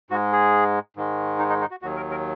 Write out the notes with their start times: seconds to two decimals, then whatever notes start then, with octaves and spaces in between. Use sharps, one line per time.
0.10 G#2 F#4
0.13 G#3
0.32 G#4
0.97 G#2 D#3 G#3
1.39 D#4
1.50 D#4
1.61 D#4
1.71 F#4
1.82 D#2 D#3 F#3 F#4
1.97 A#4
2.11 A#4